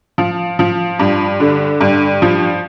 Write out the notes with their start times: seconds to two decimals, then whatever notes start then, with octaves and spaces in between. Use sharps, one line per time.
0.18 F3
0.59 F3
0.99 G2
1.40 D3
1.81 G2
2.22 F3